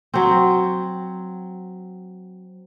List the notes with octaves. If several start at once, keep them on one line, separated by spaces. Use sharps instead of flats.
F#3 C4